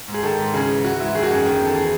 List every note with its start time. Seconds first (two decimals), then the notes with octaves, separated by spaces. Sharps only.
0.08 G#2
0.14 G#4
0.23 D#3 A4
0.39 G#2
0.54 C#3 G#4
0.69 E3
0.84 E3 F#4
1.00 G#2 E4
1.15 D#3 G#4
1.23 F#4
1.30 F#2 G#4
1.45 D#3
1.61 E2
1.66 A4
1.75 E3 G#4